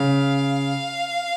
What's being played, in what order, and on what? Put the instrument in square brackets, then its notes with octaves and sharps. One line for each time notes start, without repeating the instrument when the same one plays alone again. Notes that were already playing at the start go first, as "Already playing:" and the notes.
Already playing: [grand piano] C#3 [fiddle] F5